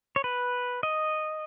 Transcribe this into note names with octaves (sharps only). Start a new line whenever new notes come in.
C#5
B4
D#5